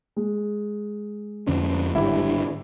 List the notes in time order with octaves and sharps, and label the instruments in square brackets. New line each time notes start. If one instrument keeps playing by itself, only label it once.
[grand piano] G#3
[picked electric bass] F2 D3 C#4
[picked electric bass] G#1 G2 D3 [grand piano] E4 G4